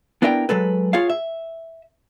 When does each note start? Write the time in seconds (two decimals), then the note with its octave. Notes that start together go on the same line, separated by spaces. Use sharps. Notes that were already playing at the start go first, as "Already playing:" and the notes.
0.22 B3 D4 E4 A#4 D#5 G5
0.49 F#3 G#3 A4 B4
0.93 F4 G#4 C#5 F5
1.10 E5